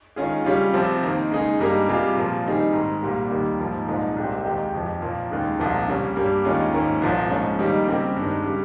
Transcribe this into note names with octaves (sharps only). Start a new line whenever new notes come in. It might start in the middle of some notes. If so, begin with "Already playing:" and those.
D#3 G#3 C#4 F4 G#4
C#3 G3 C#4 F4
C3 F3 C4
D#3 A#3 D#4
C#3 G#3 D#4 G#4
G2 G3 A#3 D#4 A#4
C3 G3 A#3 F4 G#4
A#2 F3 A#3
D#3 G3 C4 D#4 G#4
G#2 D#3 G#3
C2 A#2 G3 A#3
D#2 D#3 G3 A#3
G#2 F3 A#3
C2 A#2 F3 G#3 D#4
C2 A#2 G#3 C4 G4
D#2 D#3 G#3 D#4 G4
F2 C3 F3
A#2 F3 A#3
D#2 C#3 G#3 D#4
C2 A#2 F3 A#3
C#3 G3 A#3 C#4
G2 G3 A#3
D#2 D#3 G#3 C#4 F4
G#2 D#3 A#3 C#4
C2 A#2 F3
G#2 F3 G#3 C#4
D#3 G3 A#3 D#4
C#3 G3 C4 G4 A#4
G2 D#3 G#3
C#3 G3